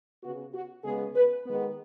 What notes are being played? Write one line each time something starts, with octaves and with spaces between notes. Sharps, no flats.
C#3 B3 F#4
F#4
C#3 G#3 B3 G#4
B4
D#3 G#3 B3